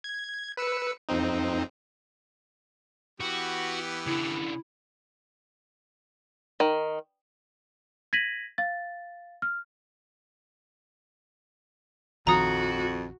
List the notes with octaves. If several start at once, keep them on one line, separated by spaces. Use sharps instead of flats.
G#6
B4 E6 C#7
F2 C4 D#4
E3 B3 F#4 G4
C#3 D4 E4
D#3
G#6 A#6 B6 D#7 F#7
F5 A6
F6
A#1 F2 D#3 F3 F#4 A#5 D#6